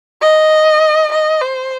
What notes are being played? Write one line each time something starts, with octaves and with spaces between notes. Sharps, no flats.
D#5
D#5
C5